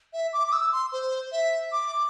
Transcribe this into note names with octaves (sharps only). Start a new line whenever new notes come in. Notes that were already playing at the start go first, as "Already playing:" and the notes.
E5
D6
D6
E6
C6
C5
E5
D6